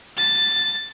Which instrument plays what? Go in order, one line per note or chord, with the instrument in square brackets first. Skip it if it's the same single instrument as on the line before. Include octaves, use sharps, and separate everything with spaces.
[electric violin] A6